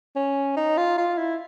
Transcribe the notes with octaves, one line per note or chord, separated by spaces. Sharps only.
C#4
D#4
F4
F4
E4